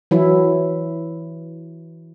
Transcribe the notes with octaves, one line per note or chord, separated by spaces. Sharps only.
E3 F#3 E4